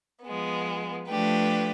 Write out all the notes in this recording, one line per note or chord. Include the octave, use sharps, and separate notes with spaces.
F3 G#3 B3
F3 A3 D4 G4 B4